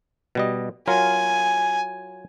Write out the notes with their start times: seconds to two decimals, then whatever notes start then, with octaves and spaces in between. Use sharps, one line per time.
0.35 B2 G3 D#5
0.88 F#3 F4 A#4 G#5